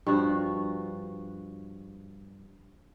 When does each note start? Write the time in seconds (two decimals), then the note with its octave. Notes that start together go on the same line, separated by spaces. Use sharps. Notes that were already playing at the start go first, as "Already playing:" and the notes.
0.07 G2 F3 F#4